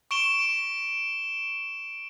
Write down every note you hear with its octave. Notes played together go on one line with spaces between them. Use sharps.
C#6 D7 E7 G7